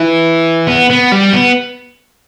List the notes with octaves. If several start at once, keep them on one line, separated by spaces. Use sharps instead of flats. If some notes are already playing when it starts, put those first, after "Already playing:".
Already playing: E3
B3
B3
G3
B3